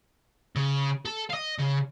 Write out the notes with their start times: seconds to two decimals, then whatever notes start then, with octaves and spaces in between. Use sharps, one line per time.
0.56 C#3
1.05 A4
1.30 D#5 F5
1.58 C#3